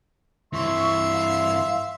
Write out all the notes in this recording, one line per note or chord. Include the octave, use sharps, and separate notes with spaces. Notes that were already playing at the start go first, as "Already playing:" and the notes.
G2 E3 E5 C6 C#6
F5